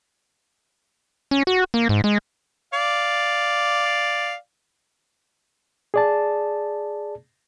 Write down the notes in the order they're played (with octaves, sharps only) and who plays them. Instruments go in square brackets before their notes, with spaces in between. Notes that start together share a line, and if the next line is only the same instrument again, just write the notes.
[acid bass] C#4
F#4
A#3
G#2
G#3
[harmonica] D5 F5
[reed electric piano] G#4 D5 A5